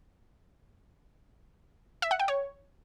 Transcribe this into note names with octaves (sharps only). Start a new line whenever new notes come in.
E5
F#5
G5
C#5